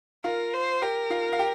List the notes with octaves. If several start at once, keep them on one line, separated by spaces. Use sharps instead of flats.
F4 A#4 F5
C5
G4 A#4 G5
F4 F5
F5
G4 G5